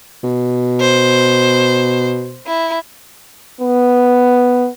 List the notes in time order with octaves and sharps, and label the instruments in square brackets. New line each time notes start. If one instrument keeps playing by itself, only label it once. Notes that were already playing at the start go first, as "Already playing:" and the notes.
[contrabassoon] B2
[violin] C5
E4
[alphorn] B3